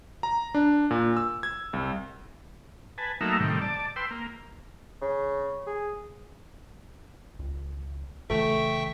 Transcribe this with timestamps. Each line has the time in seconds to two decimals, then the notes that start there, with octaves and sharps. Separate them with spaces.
0.23 A#5
0.55 D4
0.91 A#2
1.17 E6
1.43 G#6
1.73 C2
2.98 B4 G#5 A5
3.21 F#3 A3 A#3 D#4 A#4 E5
3.40 A2 C3 D#3 G3
3.61 D5 A5
3.96 B4 G5 C6 E6
4.11 A#3
5.01 C#3
5.67 G#4
7.39 C#2
8.30 A#1 C#3 E3 A3 E5 G5 C#6